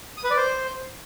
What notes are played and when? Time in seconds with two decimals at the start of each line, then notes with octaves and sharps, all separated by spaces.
0.17 D#6
0.24 B4
0.30 D5
0.37 C5